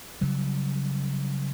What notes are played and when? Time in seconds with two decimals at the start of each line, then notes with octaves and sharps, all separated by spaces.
0.21 C#3 F#3 G3